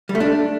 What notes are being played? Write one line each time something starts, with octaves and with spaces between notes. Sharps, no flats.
G3
A3
D4